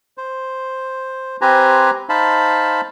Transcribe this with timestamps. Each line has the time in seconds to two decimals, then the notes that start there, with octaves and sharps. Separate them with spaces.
0.18 C5
1.41 C4 G4 B4 C5 G#5 A#5
2.09 D#4 C5 F5 A5 B5